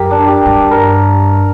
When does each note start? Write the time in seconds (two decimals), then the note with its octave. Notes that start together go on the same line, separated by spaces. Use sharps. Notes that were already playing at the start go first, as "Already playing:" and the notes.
Already playing: F#2 G4 A#4
0.11 D4
0.28 G4
0.46 G2
0.71 A#4